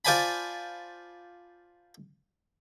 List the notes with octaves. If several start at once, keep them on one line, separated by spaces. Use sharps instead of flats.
F4 C5 D5 G#5 A5 B5